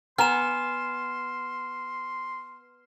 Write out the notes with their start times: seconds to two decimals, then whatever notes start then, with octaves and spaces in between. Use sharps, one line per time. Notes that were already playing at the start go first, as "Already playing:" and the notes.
0.18 B3 G#5 A#5 C6 F6 E7